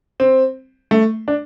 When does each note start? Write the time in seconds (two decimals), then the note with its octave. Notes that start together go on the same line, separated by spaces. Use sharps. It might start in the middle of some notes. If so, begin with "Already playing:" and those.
0.20 C4
0.91 A3
1.28 D4